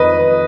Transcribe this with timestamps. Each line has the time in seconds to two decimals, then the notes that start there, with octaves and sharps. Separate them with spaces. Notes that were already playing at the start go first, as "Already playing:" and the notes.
Already playing: F2 D#3 B4 D#5